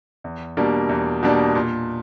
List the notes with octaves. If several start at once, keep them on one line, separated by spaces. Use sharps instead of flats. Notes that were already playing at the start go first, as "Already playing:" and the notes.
E2
B2 G3 A#3 D4
E2
B2 G3 A#3 D4
A#2